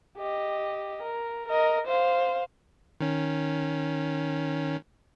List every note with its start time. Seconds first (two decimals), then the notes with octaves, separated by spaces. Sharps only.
0.17 G4 D#5
1.03 A#4
1.48 A#4 D#5
1.87 C5 F5
3.01 D#3 C#4